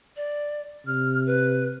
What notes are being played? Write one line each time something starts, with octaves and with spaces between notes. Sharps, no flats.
D5
C3 F6
B4